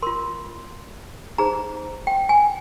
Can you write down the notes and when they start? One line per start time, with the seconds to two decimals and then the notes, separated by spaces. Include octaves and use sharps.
0.02 F4 A#4 C6
1.38 D#4 G#4 C5 A#5
2.07 G5
2.29 G#5